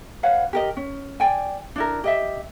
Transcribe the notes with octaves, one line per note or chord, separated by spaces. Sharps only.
B4 C#5 F5 F#5
G4 A#4 D#5
C#4
D5 G5 G#5
D4 E4 A#4
G4 D#5 E5